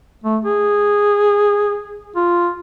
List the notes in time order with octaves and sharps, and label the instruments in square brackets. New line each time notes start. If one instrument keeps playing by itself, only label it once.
[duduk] A3
G#4
F4